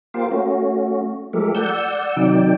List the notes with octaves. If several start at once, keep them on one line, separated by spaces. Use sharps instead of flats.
A#3 F4 G4 A#4 C5 F5
A3 C#4 F#4
F3 G#3 A3 G4 A4 A#4
D5 F#5 E6 G6
C3 D#3 F#3 D#4 D5 G5